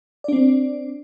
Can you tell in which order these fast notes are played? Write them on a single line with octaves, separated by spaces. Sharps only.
D5 D4 C4